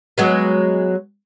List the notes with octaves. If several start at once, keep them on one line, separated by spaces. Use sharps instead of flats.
F#3 G#3 B3